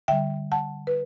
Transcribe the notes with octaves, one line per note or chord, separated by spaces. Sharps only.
D3 G3 E5 G5
F#5 A5
B4